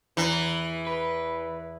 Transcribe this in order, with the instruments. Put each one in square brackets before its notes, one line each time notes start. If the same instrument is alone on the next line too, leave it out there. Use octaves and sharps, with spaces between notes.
[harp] E2 A#5 [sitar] E3
[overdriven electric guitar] B4